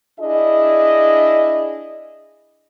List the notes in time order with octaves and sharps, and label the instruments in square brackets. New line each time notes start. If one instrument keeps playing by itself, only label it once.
[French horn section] D4 E4 G#4 D#5